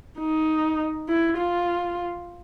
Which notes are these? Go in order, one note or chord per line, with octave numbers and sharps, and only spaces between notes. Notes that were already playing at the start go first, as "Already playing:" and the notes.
D#4
E4
F4